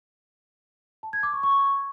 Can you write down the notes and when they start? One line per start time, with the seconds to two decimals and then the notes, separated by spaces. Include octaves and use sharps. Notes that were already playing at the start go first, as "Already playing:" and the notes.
1.03 A5
1.13 G#6
1.23 D6
1.33 C#6
1.43 C#6